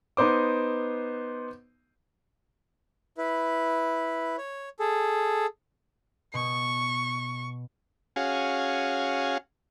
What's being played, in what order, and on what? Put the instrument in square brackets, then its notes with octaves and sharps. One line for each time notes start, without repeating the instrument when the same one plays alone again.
[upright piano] B3 D#4 C5 D6
[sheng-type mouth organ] E4 B4
C#5
G#4 A4
[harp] B2 [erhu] C#6
[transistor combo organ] C#4 F#4 G#4 F5